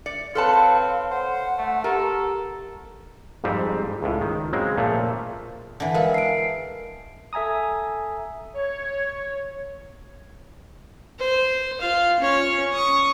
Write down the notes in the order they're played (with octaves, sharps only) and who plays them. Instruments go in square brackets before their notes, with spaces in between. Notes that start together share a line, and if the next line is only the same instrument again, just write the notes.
[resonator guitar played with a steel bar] D5 [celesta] C#7
[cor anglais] C4 [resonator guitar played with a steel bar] A4 B4 A5 [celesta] C#5 C6 F6 [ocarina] F5
[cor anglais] C5 [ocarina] F#5
[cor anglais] A3
[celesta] G4 A#5 [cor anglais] A4 [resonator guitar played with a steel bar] A#4
[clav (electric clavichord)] F2 G#2 G3 C4
C#2 A2
D#3
C#3 F#3 G#3 C4
A#2 F3 A3
[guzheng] D3 E3
[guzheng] G#3 A4 [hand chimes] A#4 F5
[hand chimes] C7 D7
[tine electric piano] A4 E5 G#5 A#5 D#6
[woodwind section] C#5
[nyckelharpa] C5
F4 F5
C#4 C#5
C#6 D#6